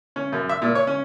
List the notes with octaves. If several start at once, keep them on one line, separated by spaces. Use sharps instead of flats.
C#4
F#2
E5
A#2
C#5
C#4